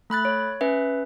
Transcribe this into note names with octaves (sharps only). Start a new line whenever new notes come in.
A3 B5 F#6 A6
C#5
C#4 B4 E5